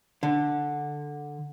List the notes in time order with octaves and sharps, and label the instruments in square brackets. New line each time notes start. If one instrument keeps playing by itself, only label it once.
[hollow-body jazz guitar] D3